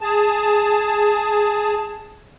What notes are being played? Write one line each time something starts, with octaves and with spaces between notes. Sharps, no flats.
G#4 A5